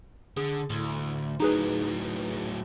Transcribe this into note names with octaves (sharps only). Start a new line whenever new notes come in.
D3 G#4
D2 A2
A2 F#3 D#4 G#4 B4